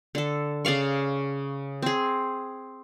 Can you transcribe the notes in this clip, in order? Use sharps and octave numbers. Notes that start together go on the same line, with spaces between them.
D3 A4
C#3 D5 F5 C#6
C4 G#4